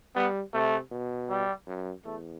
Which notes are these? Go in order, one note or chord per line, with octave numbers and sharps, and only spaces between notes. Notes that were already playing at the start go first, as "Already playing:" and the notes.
G3 B3
C3 A3
B2
G3
F#2
E2 A3